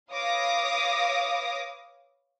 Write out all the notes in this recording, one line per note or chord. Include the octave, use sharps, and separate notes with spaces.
B4 C#5 F5 D6 D#6 A#6